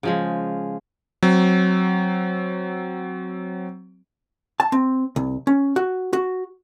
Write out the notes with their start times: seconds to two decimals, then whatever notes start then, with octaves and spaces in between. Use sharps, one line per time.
0.03 C#3 F3 G#3
1.23 F#3 C4
4.60 A5
4.72 C4
5.16 C2
5.47 C#4
5.76 F#4
6.13 F#4